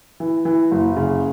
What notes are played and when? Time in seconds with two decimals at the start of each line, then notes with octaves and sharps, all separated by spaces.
0.20 E3
0.45 E3
0.71 F#1
0.96 C#3